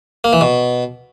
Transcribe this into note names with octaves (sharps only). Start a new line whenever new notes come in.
A#3
E3
B2